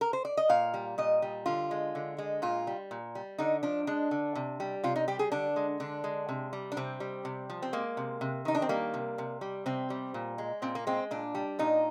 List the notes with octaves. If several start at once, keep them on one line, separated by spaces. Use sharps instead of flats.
A#4
C5
D5
D#5
A#2 F5
G3
A#2 D#5
G3
D3 F4
G#3
D3
G#3
A#2 F4
G3
A#2
G3
D3 D#4
F3 D4
G#3 D4
D3
C3
G3
C3 F4
D#4
G3 G4
G#4
D3 D4
G#3
D3 D4
G#3
C3
G3
D4
C3 C4
G3
C3
F3
C4
G#3 A#3
C3
C3
D#3 D#4
D4
C4
G3 A#3
C3
C3
G3
C3 C4
G3
A#2
G#3
A#2 C4
A#3
G#3 C4
A#2 D4
G3
A#2 D#4